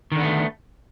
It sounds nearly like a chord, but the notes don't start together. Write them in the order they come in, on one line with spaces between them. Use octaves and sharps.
D#3 D3 B3 A3